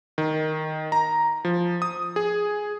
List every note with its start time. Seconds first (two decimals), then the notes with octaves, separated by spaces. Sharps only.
0.18 D#3
0.92 A#5
1.45 F3
1.82 D#6
2.16 G#4